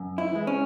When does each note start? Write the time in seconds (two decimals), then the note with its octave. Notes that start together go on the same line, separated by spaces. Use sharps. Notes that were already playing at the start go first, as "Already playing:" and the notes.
Already playing: F#2
0.18 E4
0.33 E3 G#3
0.47 C#4